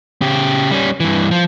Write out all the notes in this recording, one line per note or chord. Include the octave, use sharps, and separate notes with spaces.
C#3 G4
G3 C#4
G2 E3
F3